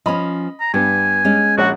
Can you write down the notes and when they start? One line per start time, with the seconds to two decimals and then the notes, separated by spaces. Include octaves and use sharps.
0.06 F3 C#4 D#5 B5
0.60 A#5
0.74 G2 B3 G#5
1.25 G#3 C#4
1.58 A#1 F#4 C#5 F#5